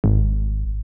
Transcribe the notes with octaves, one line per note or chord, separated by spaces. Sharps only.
G#1